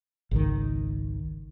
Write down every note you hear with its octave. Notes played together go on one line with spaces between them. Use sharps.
G#1 C#2 D#3